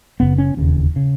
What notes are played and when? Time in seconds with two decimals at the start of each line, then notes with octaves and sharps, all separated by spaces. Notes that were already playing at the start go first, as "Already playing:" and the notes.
0.20 F#1 F#2 C#3 B3
0.38 C#4
0.57 E1 D#2 C#3
0.96 C#3